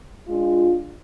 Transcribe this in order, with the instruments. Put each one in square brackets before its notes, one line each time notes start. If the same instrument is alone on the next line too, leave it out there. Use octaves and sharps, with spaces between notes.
[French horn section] G#3 D4 F4